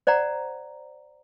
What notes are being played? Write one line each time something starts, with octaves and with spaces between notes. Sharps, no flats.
C5 D5 F#5 G5 A#5